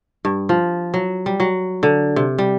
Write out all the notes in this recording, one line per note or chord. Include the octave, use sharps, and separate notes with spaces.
G2
F3
F#3
G3
F#3
D3
C3
G3